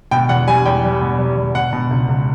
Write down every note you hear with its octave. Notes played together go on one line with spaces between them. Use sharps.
B2 G5
E2 F#5
G3 G#5
E2 G5
G3
B2
G3
E2
B2 F#5
B2
C#2
C#2